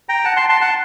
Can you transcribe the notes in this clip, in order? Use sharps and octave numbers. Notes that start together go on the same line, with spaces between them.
G5 A#5
F#5 A5
A5 C6
A5 C6
F#5 A5